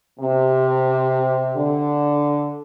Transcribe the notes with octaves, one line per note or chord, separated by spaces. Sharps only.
C3
D3